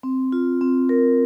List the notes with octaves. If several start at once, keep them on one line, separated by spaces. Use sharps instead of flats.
C4
F4
C4
A#4